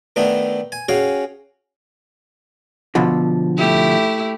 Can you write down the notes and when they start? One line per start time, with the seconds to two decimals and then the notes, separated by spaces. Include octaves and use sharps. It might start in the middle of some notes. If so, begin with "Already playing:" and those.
0.16 D#3 A3 B3 D4 D#4
0.72 G#5
0.89 C#4 F#4 G#4 F5 G5
2.95 B2 D3 F3
3.57 A3 E4 G4